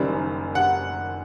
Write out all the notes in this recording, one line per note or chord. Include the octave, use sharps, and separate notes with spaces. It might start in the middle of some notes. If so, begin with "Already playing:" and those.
Already playing: F#1 F#2 D#3 G3
F#5